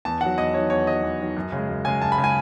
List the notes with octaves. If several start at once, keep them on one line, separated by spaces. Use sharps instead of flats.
E2 A5
D#3 F#3 F#5
E2 D#5
D#3 F#3 C#5
E2 C#5
D#3 F#3 D#5
E2
D#3 F#3
F#2
C#3 G#3
F#2
C#3 G#3 G#5
F#2 A5
B5
C#3 G#3
G#5